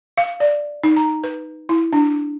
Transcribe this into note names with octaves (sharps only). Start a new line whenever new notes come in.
F5
D5
D#4
A#5
B4
E4
D4